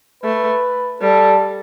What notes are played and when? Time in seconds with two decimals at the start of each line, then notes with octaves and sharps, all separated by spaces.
0.24 A3 B4
1.02 G3 A4